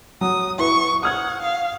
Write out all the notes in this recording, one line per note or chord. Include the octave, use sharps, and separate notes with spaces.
F#3 D#6
E4 B4 C#6
F#5 D#6 F6 G#6
F5